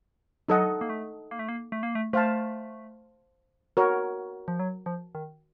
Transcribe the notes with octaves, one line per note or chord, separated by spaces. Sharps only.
F#3 D#4 A4 D#5 F#5
A#3
A3
A#3
A3
A#3
A3
A#3
A3
A3 C5 F5 A5
F#4 A#4 C#5
F3
F#3
F3
D#3